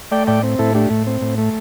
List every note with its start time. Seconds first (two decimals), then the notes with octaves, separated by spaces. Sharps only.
0.12 A3 D5 G5
0.27 A2 D5 G5
0.43 C4
0.59 A2 E4 A4
0.75 A3 D4 G4
0.90 A2
1.07 C4
1.22 A2
1.38 A3